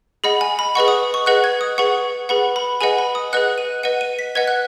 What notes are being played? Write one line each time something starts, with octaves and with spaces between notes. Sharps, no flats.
G#4 D#5 F#5 B5
G#5
B5
G#4 B4 D#5 F#5 C#6
D#6
C#6
G#4 B4 D#5 F#5 F#6
G#6
D#6
G#4 B4 F#5 C#6
G#4 B4 F#5 B5
B5
G#4 B4 D#5 F#5 G#5
B5
D#6
G#4 B4 D#5 F#5 F#6
D#7
B4 D#5 F#5 D#7
D#7
B6
B4 D#5 F#5 G#6
F#6